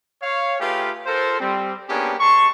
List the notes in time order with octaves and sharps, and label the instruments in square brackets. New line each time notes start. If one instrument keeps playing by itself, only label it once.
[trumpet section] C#5 F5
A3 F4 G4 G#4 B4 F5
F4 A4 A#4 C5
G3 C4
A#3 B3 C#4 D4 G4 G#4
G#3 A5 C6 C#6